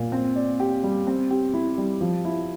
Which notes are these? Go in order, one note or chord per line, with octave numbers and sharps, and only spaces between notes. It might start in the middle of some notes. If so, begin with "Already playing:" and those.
Already playing: A#2
C4
D5
G4
G3
C4
G4
E4
G3
F3
E4